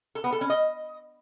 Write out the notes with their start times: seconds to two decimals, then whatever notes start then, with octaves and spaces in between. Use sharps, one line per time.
0.15 A4
0.24 B3
0.32 A4
0.41 C#4
0.50 D#5